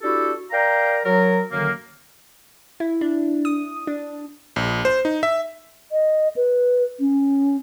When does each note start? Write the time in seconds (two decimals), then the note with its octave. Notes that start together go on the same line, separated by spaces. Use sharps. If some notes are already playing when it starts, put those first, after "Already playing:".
0.01 D4 E4 F#4 G4 A4
0.51 A#4 D5 F5 G5 A#5
1.05 F#3 A#4
1.51 F#2 D3 D#3 F#3 A#3
2.80 E4
3.01 D4
3.45 D#6
3.87 D4
4.56 A#1
4.85 C5
5.05 D#4
5.23 E5
5.92 D#5
6.37 B4
7.00 C#4